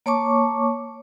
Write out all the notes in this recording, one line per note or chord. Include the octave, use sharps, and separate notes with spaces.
A#3 C#5 A5 C#6 D6